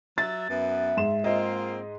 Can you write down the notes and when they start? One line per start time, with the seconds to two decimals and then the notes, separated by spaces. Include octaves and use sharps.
0.18 F#3 E5 A6
0.49 F#2 B3 E5
0.97 G#2 C6 E7
1.24 A#3 C4 F4 D#5